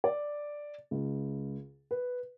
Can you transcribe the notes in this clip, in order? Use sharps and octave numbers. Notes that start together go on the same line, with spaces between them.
D5
C#2
B4